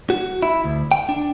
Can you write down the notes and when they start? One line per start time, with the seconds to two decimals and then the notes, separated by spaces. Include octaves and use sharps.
0.10 F#4
0.43 E4
0.64 D2
0.92 G5
1.09 D4